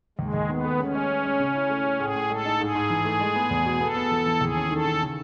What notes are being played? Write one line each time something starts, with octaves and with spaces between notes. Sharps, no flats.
D#2 G#3
D#2
D#3 B3
A3
G#3 C#4
G#3
G#3
G#3
C#3
E4
A3
A3
A2 G#4
A2
G#3 A4
D#4
G#2 G#4
G#2
E3
A3
G#3
B3
E2
B2
B3 A4
B3
E3
E3
D#2 G#4
C#4
D#3 A4
D#3
C#3